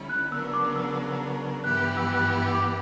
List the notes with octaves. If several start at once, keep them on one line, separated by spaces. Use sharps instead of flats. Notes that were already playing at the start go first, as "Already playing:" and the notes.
Already playing: D3 G3 C#4 E4
F#6
C#3 F#3 B3 D4 A#4 E6
D6
E6
G2 E3 B3 E4 G4 F#6
F#6
E6
F#6
E6
D6